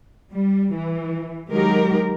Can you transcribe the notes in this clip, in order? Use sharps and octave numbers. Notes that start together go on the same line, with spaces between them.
G3
E3
D#3 F#3 G#3 D#4 G4 A#4